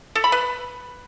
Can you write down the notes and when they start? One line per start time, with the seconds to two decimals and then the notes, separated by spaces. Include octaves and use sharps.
0.15 A4
0.24 B5
0.32 B4